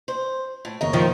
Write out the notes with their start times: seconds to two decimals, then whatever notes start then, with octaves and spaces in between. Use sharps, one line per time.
0.08 C5
0.65 A2
0.81 F#1 A#4 C#5 D#5
0.93 D#3 F3